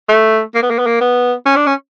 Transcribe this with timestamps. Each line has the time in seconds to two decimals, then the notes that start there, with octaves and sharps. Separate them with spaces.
0.09 A3
0.55 A#3
0.62 B3
0.70 A#3
0.78 B3
0.86 A#3
1.01 B3
1.46 C#4
1.56 D4
1.66 C#4